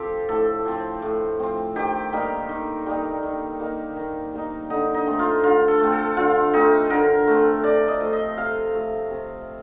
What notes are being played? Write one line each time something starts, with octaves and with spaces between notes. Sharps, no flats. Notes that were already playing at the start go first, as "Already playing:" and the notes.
Already playing: F3 C4 G4 A4 G5
A2 A4
F3 C4
A2
F3 C4
D#3 G4
G3 A#3 D#4
D#3
G3 A#3 D#4
D#3
G3 A#3 D#4
D#3
G3 A#3 D#4
D3 D#4
D#4
A3 C4
F4
D3 F4
A4
A3 C4
A4
D3 F4
A3 C4 D#4
D3 A#4
A3 C4
C3 D5
D#5
F3 A3
D#5
C3 F5
F3 A3
C3